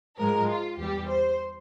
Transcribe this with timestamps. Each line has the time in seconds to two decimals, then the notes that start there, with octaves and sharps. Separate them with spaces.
0.18 G#2 F3 G#3 A#4
0.49 F4
0.77 E2 E3 G3 G4
1.07 C5